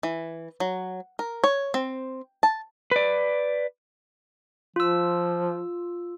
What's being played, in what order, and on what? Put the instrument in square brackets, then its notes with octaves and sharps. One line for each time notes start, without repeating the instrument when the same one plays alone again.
[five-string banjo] E3
F#3
A#4
C#5
C4
A5
[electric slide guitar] B4 D5
[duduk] F3 [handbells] F4 E6